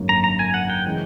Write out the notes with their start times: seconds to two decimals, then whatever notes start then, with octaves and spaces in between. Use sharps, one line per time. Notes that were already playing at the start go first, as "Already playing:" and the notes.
Already playing: G#1 F#2 D3 F#3 A#3
0.09 A#5
0.24 A#5
0.39 G#5
0.54 F#5
0.70 G5
0.86 C#3 E3 G#3